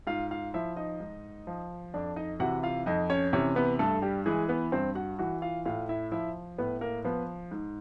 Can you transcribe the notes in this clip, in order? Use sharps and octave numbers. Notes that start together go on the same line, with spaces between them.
G#2 F4 F5
F4 F5
F3 E4 E5
D#4 D#5
G#2
F3
F2 D4 D5
D#4 D#5
C3 E3 F#4 F#5
F4 F5
F2 D#4 D#5
C#4 C#5
C3 E3 C#4 C#5
B3 B4
G2 A3 A4
G3 G4
E3 G#3 G#4
B3 B4
G2 C4 C5
F#4 F#5
E3 F#4 F#5
F4 F5
A2 F4 F5
E4 E5
F3 E4 E5
A2 B3 B4
A#3 A#4
F3 B3 B4
G#2